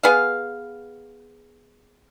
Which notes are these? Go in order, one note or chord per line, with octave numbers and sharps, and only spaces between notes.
B3 G#4 F5